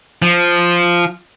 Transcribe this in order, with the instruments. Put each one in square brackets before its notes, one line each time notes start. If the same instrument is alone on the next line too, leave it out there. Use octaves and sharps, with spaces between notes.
[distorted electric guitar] F3